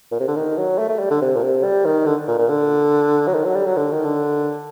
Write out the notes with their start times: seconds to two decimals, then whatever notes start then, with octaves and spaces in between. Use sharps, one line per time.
0.12 A#2
0.20 C3
0.27 D3
0.36 D#3
0.57 F#3
0.79 A3
0.89 A3
0.99 G3
1.10 D3
1.21 C3
1.35 A#2
1.43 C3
1.63 G3
1.85 D#3
2.06 D3
2.28 A#2
2.38 A#2
2.49 D3
3.27 F#3
3.34 D#3
3.45 F#3
3.55 G3
3.66 F#3
3.77 D3
3.91 D#3
4.04 D3